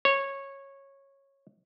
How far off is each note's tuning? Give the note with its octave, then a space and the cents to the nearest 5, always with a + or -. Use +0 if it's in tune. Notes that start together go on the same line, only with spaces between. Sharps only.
C#5 -15